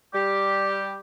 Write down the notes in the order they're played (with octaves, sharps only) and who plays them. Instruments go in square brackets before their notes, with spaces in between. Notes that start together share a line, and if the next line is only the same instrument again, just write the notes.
[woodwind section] G3 G4